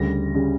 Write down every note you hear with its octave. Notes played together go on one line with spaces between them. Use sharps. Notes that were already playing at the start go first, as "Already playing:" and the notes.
Already playing: D2 C#3 G3 A#6
C#3 G3